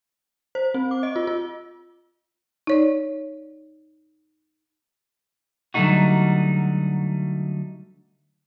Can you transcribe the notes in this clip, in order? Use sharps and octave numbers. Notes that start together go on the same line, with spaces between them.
C5
C4
D6
D#5
F4
F4
D#4 C#5 D5
D3 F#3 G3 A3 D#4 F#4